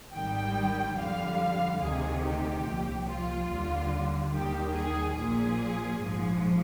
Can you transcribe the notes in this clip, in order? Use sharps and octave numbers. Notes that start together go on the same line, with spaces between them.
G#1 G#2 D#3 G3 G5
F2 D3 G3 F5
D2 C3 D#3 G#4
G4
C2 A#2 F3
F4
D#2 D3 G3
D#2 D#3 G3 G4
G#4
A#1 A#2 F3 G#4
A#1 G#2 F3